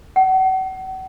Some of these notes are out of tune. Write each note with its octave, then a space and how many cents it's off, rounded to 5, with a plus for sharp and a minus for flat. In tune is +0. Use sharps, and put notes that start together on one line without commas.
F#5 +35